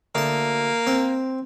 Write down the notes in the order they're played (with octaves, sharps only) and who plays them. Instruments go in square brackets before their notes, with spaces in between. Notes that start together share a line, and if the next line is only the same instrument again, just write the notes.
[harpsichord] D2 A5 [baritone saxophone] A#3
[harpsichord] C4